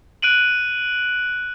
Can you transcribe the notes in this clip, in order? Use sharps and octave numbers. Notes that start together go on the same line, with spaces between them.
F#6 D7 D#7 F#7